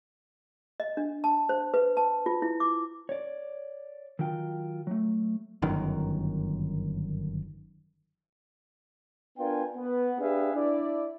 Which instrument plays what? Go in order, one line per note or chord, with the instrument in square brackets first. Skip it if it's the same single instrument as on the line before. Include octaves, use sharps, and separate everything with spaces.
[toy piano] D#5
D4
A5
C5
B4
A5
F4
E4
D6
[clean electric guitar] C#5 D5
D#3 F#3 F4 G5
F#3 A3
[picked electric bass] G1 F#2 D#3
[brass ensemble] B3 D4 F4 A#4 G5 G#5
B3
D4 G4 G#4 B4 E5 F5
D4 E4 D5